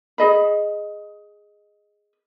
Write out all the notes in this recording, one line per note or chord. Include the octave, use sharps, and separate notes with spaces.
G#4 D#5 B5